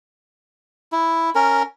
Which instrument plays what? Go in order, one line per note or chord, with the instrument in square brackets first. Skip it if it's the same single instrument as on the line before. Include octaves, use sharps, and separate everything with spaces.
[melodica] E4
C#4 A#4